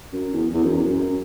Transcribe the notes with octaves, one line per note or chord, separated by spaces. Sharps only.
F#2
E2
E2
F#2
E2
F#2
F#2